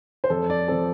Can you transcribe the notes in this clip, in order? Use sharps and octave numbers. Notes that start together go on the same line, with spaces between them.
C5
F2 A4
D5
F3 C4 A4